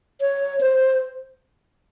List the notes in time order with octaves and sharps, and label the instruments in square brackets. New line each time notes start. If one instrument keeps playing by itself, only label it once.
[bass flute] C#5
C5